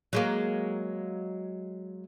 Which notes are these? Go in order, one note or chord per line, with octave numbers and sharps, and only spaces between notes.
F#3 G#3 A#3